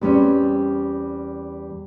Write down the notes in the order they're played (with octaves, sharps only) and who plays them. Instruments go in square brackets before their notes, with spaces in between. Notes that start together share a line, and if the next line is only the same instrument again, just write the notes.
[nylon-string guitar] E2 G3 C4 C#4